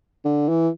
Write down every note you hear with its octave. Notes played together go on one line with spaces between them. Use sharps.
D3
E3